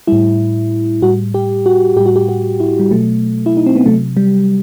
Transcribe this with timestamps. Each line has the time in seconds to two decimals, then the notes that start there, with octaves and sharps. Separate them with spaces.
0.07 A2 G3 E4
1.02 A2 G3 F#4
1.34 G4
1.66 F#4
1.96 A2 G3 G4
2.06 F#4
2.16 G4
2.29 F#4
2.60 E4
2.79 G3
2.91 B2 F#3 A3
3.46 E4
3.57 D#4
3.66 C4
3.76 B3
3.86 C3 F#3 A3
4.17 G3